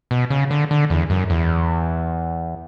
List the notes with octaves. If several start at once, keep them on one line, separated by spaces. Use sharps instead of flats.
B2
C#3
D3
D3
E2
F#2
E2